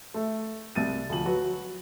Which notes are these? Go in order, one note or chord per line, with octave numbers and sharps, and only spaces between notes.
A3
C2 A6 D#7
D2 F3 F#7
F#3 F#4 B4